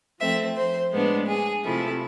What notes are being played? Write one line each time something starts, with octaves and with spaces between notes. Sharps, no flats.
F3 A3 C4 E5
C5
A2 G#3 B3 D4
G#4
C3 F3 A3 E4